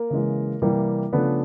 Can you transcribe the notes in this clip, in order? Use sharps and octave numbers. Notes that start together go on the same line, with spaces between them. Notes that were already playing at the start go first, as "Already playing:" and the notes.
Already playing: A#3 A#4
C#3 E3 G#3
C3 E3 G3 A#3
C#3 F3 A3 B3 D4 B4